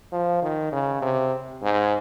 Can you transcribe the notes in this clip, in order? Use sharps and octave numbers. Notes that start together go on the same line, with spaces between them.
F3
D#3
C#3
C3
G#2